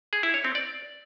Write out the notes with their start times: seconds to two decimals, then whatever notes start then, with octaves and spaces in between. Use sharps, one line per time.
0.13 G#4
0.23 E4
0.34 C#5
0.44 C4
0.55 D5